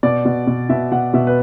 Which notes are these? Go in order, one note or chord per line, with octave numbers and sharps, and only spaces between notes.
B2 D5
B2
B2
B2 E5
B2 F#5
B2 E5
B4